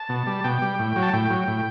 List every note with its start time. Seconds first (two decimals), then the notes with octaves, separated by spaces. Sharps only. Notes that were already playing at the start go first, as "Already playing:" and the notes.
Already playing: A5
0.09 B2
0.27 G3
0.44 B2 G5
0.62 G3
0.79 A2
0.96 F#3
1.03 A5
1.13 A2 G5
1.30 F#3
1.48 A2